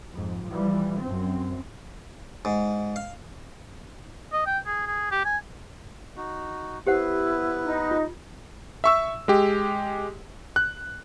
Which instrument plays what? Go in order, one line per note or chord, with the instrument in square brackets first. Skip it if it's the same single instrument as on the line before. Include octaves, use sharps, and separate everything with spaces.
[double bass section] F2 G#2
E3 F3 G3
F#2 C4
[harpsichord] G#2
F5
[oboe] D#5
G5
G#4
G#4
G4
G#5
[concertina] D#4 F#4
[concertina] B3 B4 [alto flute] E4 [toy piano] G4 C5 F#5
[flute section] D#4
[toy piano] F4
[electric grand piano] E5 C#6 E6
G#3 G4
F#6